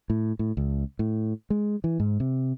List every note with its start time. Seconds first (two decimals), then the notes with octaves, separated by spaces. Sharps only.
0.10 A2
0.39 A2
0.57 C#2
0.99 A2
1.50 G#3
1.84 E3
2.00 G#2
2.20 C3